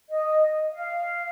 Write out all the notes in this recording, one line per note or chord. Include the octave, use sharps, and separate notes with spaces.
D#5
F5